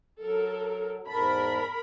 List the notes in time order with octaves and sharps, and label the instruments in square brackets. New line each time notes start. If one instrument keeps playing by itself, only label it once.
[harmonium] F#3 [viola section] A4 A#4
[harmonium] E2 G#2 A5 [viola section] A#4 B5